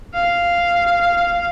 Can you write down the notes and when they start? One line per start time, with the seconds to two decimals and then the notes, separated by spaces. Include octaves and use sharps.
0.14 F5